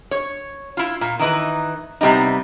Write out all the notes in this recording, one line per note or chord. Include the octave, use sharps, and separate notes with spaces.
C#5
E4 F4
A#2
D#3 E3 D#4 B4
C3 G3 B3 D#4